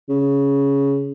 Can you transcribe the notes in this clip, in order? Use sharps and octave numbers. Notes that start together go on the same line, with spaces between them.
C#3